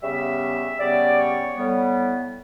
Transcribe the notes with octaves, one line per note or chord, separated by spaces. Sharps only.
C#3 G3 B3 E5
C#3 G3 B3 D5
C#5
A2 G3 B3